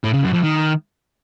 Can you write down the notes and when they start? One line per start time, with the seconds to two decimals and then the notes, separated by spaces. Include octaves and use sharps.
0.04 A2
0.14 C#3
0.24 F#2
0.33 F2
0.43 D#3